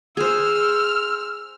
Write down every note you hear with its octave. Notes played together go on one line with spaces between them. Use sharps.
G#4 C5 E6 F6